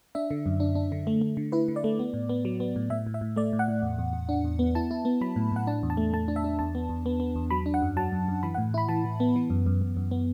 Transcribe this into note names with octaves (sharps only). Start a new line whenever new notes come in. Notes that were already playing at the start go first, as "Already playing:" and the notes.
D4 E5
D3
F#2
D4
D4
D3
A3
A3
D3
E4 B4
D3
D5
A3
B3
A2
B3
F#3
B3
A2
A2 E5
A2
E5
A2
A3 D5
A2
F#5
A2
E2
E2
E2
D4
E2
B3
E4 A5
E4
B3
F#3 B5
A2
A2 F#5
D4 A5
E2
A5
A3
A3 A5
D4
E5
D4
E2 A5
B3
E2
B3
B3
E2
F#3 B5
D4
F#5
F#2
F#3 A5
F#2
F#2
E3 B5
F#5
A2
E4 B5
E3 A5
E3
B3
E3
F#2
F#2
F#2
F#2
B3